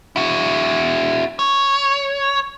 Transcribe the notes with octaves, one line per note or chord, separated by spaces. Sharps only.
E4 F#4
C#5